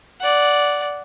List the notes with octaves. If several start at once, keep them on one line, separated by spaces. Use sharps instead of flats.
D5 F#5